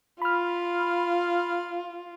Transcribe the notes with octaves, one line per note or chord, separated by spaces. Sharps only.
F4 B5 F6